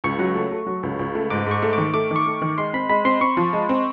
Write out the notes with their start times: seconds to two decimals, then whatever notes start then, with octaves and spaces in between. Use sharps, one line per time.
0.04 C#2 C#6
0.19 F#3
0.35 A3
0.51 A3
0.67 F#3
0.83 C#2
0.99 C#2
1.15 A3
1.30 G#2 D6
1.47 G#2 C#6
1.62 A3
1.73 D#3 D6
1.94 A3 D6
2.11 D#3
2.16 C#6
2.26 A3
2.42 D#3
2.58 G#3 C6
2.73 C4 B5
2.90 G#3 B5
3.05 C4 C6
3.21 C4 C#6
3.37 F3
3.53 G#3
3.69 C4